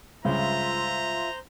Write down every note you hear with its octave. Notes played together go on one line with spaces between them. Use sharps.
C#2 G2 C#3 F4 C5 E5 A#5